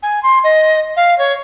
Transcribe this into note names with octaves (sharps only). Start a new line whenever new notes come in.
G#5
C6
D#5
F5
C#5